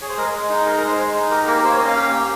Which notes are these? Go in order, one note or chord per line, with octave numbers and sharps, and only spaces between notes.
G#4 C#5
C5
G#3 A#4
G#4
G#3
D#4
G#4 A#4
A#4
G#3 C5
G#3
D#4
G4 A#4
A#3 A#4
A#3 C5
C#5
C#4 D#5
F5
G4
A#3